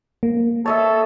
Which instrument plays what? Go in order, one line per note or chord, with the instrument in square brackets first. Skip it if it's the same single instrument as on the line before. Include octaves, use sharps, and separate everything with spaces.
[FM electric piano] A#3
[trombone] A4 [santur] C#5 D#5 E5 [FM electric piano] A5